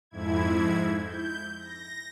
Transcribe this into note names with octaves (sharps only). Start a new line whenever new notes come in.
F2 G#2 E4 G#6
G6
A#6